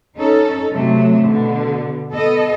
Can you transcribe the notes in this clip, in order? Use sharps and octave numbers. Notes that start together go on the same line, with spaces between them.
C#4 D#4 A4
C3 F#3 A3
B2 D3
B3 A4 D#5